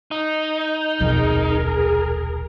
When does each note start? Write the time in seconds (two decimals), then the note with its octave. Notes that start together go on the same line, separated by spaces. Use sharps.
0.11 D#4
1.00 D#1 B1 F2 G#4 A#4